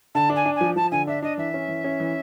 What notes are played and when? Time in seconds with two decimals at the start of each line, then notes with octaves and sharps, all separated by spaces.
0.15 D3 A5
0.30 D4
0.36 G#5
0.46 D4
0.56 G#5
0.61 F3
0.76 F3 A5
0.91 D3 G#5
1.07 D4 E5
1.22 D4 D#5
1.37 E3 E5
1.54 C#4
1.68 E3
1.84 C#4
2.00 E3